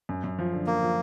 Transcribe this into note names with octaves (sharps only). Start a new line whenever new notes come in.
F#2
F#2
F3
D3
F3 A#3
F3